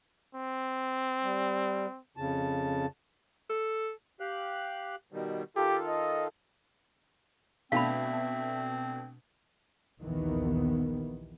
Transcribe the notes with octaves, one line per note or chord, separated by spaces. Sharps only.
C4
G3
F2 C#3 A5
A4
G4 F5 F#6
B2 D#3 G3
D#3 F4 G4 A4
D#5
B2 A3 C4 D4 E5 F5 A5 B5
A#1 D#2 D#3 E3 B3